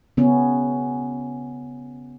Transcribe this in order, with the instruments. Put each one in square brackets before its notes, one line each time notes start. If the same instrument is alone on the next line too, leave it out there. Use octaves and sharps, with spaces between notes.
[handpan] C#3 B3 C#4